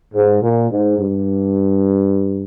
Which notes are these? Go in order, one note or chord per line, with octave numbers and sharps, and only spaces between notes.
G#2
A#2
G#2
G2